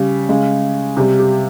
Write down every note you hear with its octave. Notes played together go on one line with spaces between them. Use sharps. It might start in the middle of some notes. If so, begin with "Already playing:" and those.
Already playing: C#3 G3
C#3 G#3
C3 G3 G4
G4